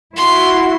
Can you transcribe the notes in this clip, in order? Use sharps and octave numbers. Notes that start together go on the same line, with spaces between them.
E4 F#4 C6